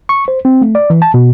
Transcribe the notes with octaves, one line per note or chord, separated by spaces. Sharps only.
C#6
C5
C4
A3
D5
E3
A5
B2